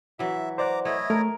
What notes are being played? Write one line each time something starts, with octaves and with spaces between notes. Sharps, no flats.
E3 F#3 E5
C5 D5 F#5 A#5 D6
A3 E4 C#5 D#5
A3 A#4